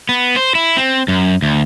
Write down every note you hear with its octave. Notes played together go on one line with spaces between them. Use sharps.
B3
C5
E4
C4
F#2
D2